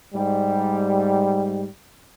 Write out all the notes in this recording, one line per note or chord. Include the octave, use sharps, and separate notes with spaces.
G#2 G3